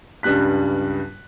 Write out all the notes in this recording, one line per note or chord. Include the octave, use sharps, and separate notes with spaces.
C#2 G2 G3 F#6 B6